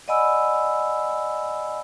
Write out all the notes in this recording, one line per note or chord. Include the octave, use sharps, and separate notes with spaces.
D5 D#5 F#5 G#5 B5 E6